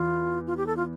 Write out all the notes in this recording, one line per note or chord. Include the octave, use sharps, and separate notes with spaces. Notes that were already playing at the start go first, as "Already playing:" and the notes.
Already playing: E2 E3 F4
F4
G4
A4
F4